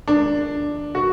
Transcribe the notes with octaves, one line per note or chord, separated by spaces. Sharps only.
D4
F#4